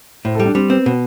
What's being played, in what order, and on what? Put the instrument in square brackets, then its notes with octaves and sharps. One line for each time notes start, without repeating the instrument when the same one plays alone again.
[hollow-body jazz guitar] A2 [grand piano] C5
[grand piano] A4
[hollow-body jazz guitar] G3
[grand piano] D4
[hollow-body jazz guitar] G3 [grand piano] C4
[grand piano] B3 [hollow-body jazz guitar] C4
[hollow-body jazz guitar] B2